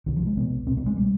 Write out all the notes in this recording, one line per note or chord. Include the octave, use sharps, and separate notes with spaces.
C2 B2 D#3
F3
G#3
C2 B2 B3
C2 B2 C4
B3
G#3
B2 G3